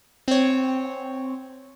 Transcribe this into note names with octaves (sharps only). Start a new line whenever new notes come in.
C4 C#5